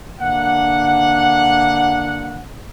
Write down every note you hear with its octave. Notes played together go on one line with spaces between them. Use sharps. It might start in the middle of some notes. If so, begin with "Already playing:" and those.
D3 A#3 D4 F#5